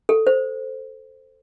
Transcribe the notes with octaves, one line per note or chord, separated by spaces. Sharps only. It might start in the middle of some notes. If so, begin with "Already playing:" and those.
A4
C5